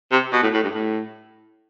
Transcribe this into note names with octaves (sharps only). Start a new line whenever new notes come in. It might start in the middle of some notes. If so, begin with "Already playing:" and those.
C3
B2
A2
A2
G2
A2